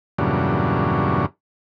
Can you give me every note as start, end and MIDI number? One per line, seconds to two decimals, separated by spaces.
0.18 1.26 40
0.18 1.26 43
0.18 1.26 46
0.18 1.26 49
0.18 1.26 54
0.18 1.26 62